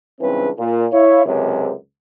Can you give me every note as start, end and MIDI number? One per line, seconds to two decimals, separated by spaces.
0.21 0.49 37
0.21 0.49 43
0.21 0.49 49
0.21 0.49 52
0.21 0.49 60
0.21 0.49 71
0.58 0.85 46
0.92 1.24 64
0.92 1.24 73
0.92 1.24 77
1.25 1.71 37
1.25 1.71 42
1.25 1.71 48